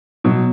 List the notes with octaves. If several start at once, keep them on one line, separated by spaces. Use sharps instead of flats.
B2 F#3